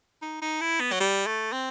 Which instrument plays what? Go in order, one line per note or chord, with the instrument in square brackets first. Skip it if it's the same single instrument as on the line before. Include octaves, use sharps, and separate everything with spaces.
[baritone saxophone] D#4
D#4
E4
B3
F#3
G3
A3
C4